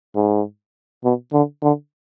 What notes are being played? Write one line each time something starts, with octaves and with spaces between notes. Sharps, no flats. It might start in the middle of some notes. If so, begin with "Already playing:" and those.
G#2
B2
D3
D3